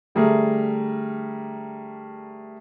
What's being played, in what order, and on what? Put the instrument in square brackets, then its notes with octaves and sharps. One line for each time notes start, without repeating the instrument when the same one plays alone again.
[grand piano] D3 G3 A3 G#4 A#4